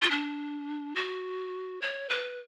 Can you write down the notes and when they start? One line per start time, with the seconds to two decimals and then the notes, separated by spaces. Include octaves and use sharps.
0.02 F4
0.11 D4
0.96 F#4
1.82 C#5
2.09 B4